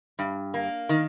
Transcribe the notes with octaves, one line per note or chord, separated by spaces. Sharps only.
G2
A#3
D#3